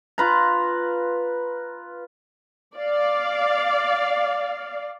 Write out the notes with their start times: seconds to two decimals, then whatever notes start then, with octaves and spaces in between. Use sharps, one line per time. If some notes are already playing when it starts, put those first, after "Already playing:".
0.18 F4 B4 A#5
2.77 D5 F5